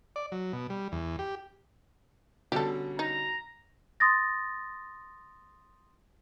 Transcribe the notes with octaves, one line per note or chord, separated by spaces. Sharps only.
D5
F#3
B2
G3
E2
G4
B2 D3 G3 C#4 G4 A4
D#4 A#5
C6 D#6 A6 A#6